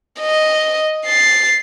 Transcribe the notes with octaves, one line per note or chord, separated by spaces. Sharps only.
D#5
A6 C7